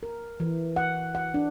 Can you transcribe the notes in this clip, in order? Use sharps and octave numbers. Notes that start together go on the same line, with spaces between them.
A#4
E3
F#5
F#5
D4